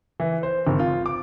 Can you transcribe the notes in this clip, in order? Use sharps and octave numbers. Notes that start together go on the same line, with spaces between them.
E3
C5
G#1
F4
D6